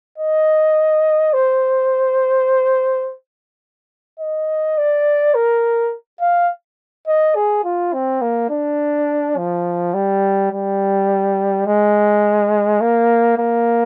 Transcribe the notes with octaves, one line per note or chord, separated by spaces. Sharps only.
D#5
C5
D#5
D5
A#4
F5
D#5
G#4
F4
C4
A#3
D4
F3
G3
G3
G#3
A#3
A#3